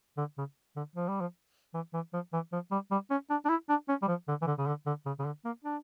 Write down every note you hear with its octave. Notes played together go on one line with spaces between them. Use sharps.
D3
C#3
D3
F3
G3
F3
E3
E3
F3
E3
F3
G3
G3
C#4
D4
D4
E4
D4
C#4
G3
F3
D3
E3
D3
C#3
D3
D3
C#3
C#3
D3
A#3
D4